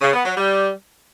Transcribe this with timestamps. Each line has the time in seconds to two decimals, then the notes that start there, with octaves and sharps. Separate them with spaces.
0.01 C#3
0.13 B3
0.25 F#3
0.37 G3